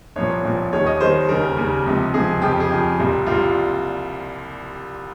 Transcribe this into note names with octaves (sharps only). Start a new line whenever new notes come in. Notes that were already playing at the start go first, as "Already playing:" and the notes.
C2 A#2 F3 C#5
C2 A#2 F3
D#2 D#3 G3 C#5
D#5
D#2 D#3 G3 C5
D#2 C#3 G3 A#4
D#2 C#3 G3
C#2 C3 F3
C#2 C3 F3 G#4
F2 C#3 F3 G4
G#4
F2 C#3 F3 G4
C2 A#2 G3
C2 A#2 G3 F4